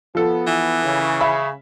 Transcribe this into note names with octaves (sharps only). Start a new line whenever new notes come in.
F3 B3 A4
E3
C#3
E5 B5